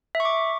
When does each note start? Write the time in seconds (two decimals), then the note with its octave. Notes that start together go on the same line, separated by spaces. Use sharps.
0.15 E5
0.20 C#6
0.25 D6